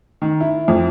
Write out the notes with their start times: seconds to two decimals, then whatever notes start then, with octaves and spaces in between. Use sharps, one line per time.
0.22 D#3
0.40 E4
0.68 F2